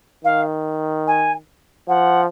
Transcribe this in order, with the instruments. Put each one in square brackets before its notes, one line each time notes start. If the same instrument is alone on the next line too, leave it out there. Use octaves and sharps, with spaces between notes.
[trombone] D#3 [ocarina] F5
[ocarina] G#5
[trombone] F3 [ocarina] F#5